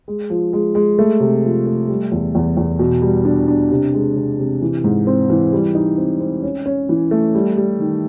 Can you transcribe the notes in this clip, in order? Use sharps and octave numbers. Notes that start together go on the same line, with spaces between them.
G#3
F3
G#3
G#3
A3
C3
F3
A3
G3
E2
E2
E2
B2
G3
D4
D4
C3
G#3
C3
C3
E3
G#2
C4
E3
G3
D#4
C4
C4
C#4
C#4
E3
A3
G3
G3
D#3